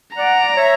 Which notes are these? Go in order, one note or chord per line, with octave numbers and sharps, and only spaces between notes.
D5 F#5 A#5
C#5 E5